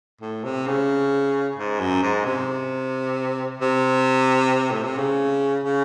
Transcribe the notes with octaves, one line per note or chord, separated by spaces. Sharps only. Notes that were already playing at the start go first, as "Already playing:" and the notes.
A2
C3
C#3
G#2
F#2
G#2
C3
C3
A2
C3
C#3
C#3